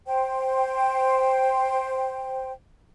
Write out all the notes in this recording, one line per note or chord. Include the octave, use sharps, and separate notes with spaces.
C5 G5